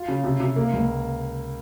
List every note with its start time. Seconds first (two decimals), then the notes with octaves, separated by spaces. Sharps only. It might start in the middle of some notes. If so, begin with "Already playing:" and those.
Already playing: F4
0.08 C#3
0.24 C3
0.40 C3
0.56 A#3
0.73 C#2